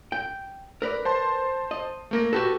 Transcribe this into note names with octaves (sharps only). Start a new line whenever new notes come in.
G5
A#4 B4 D5
C5 A5 C6
D#5
A3 A#3 A#6
F#4 G4 A4 B4